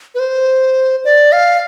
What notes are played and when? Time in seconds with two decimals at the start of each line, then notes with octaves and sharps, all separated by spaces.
0.15 B4
0.19 C5
1.05 D5
1.32 F5